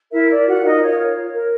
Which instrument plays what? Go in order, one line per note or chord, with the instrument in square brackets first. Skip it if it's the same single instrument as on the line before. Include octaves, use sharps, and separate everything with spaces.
[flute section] E4 A#4 E5
A#4 D5
F4 F#4 F#5
D#4 A#4 D#5
F4 C#5
C#5
C#5
A#4